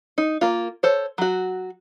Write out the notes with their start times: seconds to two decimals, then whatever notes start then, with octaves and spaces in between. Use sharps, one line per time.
0.18 D#4
0.41 A#3 F4
0.83 A4 C5 C#5
1.18 F#3 F#4